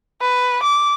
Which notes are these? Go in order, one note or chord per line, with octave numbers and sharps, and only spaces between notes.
B4
D6